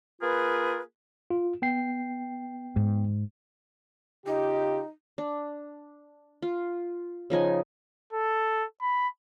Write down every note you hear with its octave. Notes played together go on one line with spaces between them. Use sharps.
A#3 F4 G#4 A#4 B4
F4
B3 G5 C7
G#2
C#3 D#4 F4 G4
D4
F4
C#3 F3 D#4 G#5
A4
B5